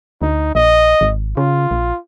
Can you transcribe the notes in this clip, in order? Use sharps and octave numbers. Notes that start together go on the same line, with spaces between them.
D2 D#4
A#1 D#5
G#1
C#3 F4
A#1